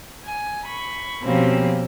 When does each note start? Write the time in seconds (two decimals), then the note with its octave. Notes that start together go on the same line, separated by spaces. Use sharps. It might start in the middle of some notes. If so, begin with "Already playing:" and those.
0.25 G#5
0.66 B5 C#6
1.22 B2 F3 A#3 C4 C#4 G4